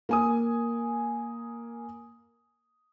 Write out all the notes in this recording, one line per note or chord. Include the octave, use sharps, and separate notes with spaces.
A#3 G#5 D#6